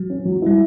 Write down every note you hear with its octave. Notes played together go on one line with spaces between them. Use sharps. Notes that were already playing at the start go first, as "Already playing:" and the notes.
Already playing: F#3
C#4
F#3
G3 E4